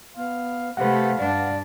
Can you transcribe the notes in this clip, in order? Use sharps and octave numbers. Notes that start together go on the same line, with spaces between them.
B3 F5
C3 A3 G4 B4 F5 F#5
G2 D4 D5